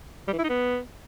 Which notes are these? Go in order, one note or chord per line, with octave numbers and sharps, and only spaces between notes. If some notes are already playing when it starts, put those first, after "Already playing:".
G3
E3
E4
D#4
B3